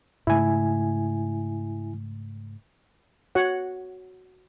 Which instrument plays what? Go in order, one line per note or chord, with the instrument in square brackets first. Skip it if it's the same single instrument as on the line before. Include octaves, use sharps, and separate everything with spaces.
[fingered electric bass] G#2 C#3 A3 [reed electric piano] E4 G#5
[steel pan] F#4 C#5 F#5